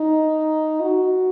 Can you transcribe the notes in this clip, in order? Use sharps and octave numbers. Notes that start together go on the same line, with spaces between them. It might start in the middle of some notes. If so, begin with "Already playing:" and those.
Already playing: D#4
F#4